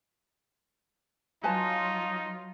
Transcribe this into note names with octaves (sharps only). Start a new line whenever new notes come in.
F#3 D#4 F4 B4 G#5 A5